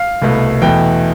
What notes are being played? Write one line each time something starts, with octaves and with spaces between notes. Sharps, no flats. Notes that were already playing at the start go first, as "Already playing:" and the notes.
Already playing: F5
C2 B2 A3
E2 B2 A3 G5